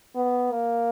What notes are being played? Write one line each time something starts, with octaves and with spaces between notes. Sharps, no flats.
B3
A#3